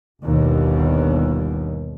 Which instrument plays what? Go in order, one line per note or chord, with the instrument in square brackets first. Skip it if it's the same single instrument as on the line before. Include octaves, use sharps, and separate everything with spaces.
[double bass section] G1 D#2 B2